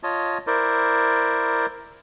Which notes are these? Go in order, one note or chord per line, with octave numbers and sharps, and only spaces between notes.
F4 C#5 D#5 A5
E4 A#4 C5 D5